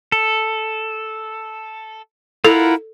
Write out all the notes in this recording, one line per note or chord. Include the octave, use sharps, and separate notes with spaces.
A4
E4 F4 A4 A#4 F#5